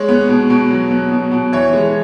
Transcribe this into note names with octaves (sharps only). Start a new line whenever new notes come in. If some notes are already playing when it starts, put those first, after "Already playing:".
Already playing: G#3 C#5
B3
B2
B2
F#3
B3
B2
B2
E3 C#5
G#3